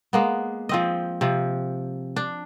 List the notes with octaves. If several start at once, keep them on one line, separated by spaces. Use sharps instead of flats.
G#3 A#3 B3
F3 C4 D#5
C3 F3
D4